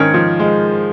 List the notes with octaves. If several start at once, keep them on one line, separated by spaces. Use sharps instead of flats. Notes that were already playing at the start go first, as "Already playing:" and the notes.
Already playing: G#2 D#3 C#4 A#4 C#5
F3
G#3